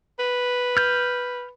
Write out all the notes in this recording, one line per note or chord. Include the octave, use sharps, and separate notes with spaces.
B4
F6 G6